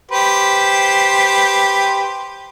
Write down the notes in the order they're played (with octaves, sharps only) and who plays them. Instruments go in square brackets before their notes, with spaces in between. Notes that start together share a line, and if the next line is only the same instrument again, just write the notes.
[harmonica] G4 B4 C5